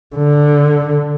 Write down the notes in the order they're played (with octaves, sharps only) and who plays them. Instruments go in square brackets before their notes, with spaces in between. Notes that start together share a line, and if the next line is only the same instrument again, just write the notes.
[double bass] D3